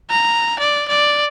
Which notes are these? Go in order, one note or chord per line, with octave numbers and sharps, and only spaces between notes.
A#5
D5
D5